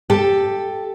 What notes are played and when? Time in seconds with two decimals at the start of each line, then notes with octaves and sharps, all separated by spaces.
0.10 G4 A4